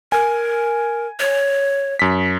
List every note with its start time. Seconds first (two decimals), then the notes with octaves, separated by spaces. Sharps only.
0.12 A#4 G#5
1.20 C#5
1.99 F#2 B6